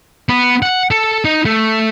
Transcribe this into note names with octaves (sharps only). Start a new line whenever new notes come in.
B3
F#5
A4
D#4
A3